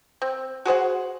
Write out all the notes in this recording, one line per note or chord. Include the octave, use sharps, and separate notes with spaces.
C4
F#4 G#4 C5 F#5